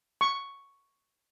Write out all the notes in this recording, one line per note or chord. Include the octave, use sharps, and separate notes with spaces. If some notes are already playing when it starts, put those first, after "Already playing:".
C#6